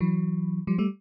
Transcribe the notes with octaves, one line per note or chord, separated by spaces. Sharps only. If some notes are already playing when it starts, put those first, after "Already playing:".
E3 F#3
F3 G3
G3 A3